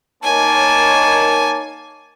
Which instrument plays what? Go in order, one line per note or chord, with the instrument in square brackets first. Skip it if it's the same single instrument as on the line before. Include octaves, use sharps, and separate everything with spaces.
[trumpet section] A#3 A5 [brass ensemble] D#4 A#4 C#5 [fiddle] G#5